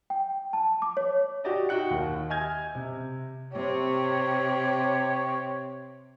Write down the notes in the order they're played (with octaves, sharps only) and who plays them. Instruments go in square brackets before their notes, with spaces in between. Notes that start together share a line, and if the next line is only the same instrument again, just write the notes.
[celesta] G5
A5
D6
C#5
[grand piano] F#4 G4 D5 D#5
D#4 F#4 G5 F#6 C#7
D#2 D#3
D#5 E5 G#5 F6 G6 G#6
C3
[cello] C3 G4 [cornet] C#5